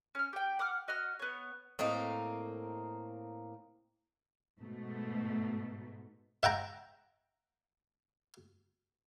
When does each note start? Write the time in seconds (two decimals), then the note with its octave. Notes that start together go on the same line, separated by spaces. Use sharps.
0.15 C#4 F6
0.33 G4 G5
0.59 F#5 D6 F6
0.88 F#4 D#5 F#5 F6
1.19 B3 C#5
1.79 A2 A#3 C4 D#4
4.60 G#2 B2 A3
6.43 E5 F#5 G5 A#5